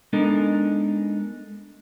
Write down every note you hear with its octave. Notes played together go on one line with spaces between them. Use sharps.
G#3 B3 D4 D#4 A4 A#4